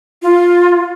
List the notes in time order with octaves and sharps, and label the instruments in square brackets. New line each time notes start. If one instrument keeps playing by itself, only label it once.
[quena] F4